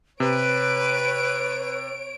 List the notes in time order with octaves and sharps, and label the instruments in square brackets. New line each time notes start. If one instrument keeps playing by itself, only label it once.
[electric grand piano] C3 [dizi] B4 [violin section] C#5 D7